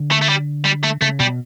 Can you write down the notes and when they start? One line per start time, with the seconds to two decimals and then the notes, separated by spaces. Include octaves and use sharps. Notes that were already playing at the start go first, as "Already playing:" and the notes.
Already playing: D3
0.11 A3
0.22 A3
0.29 G3
0.65 G3
0.84 A3
1.02 C#3 A3
1.20 B2 G3